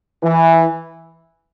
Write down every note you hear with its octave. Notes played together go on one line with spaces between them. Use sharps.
E3